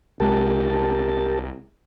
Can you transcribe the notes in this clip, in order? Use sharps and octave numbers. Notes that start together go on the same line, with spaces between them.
C2 G#3 G4 A#4 A5